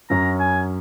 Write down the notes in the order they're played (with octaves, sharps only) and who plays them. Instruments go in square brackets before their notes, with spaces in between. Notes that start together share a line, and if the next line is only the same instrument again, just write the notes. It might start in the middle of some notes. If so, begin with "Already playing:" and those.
[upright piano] F#2 F#3 C#4 [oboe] A#5
[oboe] G#5